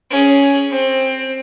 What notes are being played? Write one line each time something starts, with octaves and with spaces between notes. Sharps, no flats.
C#4 G#4
C4